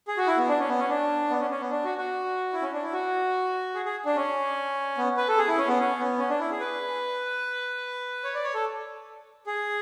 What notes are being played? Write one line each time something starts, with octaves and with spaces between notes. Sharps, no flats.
G#4
F#4
E4
B3
D4
C#4
B3
C#4
D4
B3
C#4
C#4
B3
D4
F#4
F#4
E4
C#4
D4
E4
F#4
G#4
G#4
D4
C#4
B3
B4
A4
G#4
E4
C#4
B3
C#4
B3
C#4
D4
E4
G#4
B4
C#5
D5
C#5
A4
G#4